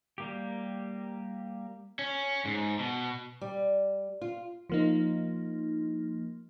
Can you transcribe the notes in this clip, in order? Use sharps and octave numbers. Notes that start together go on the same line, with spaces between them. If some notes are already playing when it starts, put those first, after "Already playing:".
G3 A#3 G4
C#4
G#2
B2
G3
F4
F3 A#3 D#4